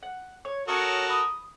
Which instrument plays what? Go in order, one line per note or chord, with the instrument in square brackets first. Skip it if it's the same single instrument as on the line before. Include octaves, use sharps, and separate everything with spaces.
[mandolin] F#5
C#5
[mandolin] C#4 C#6 D#6 [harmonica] F#4 A4 A#4
[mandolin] B5 D#6